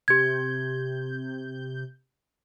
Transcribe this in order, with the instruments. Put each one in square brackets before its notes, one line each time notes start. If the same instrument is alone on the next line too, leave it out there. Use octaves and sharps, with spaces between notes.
[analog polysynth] C3 G6 [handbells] G4 G#6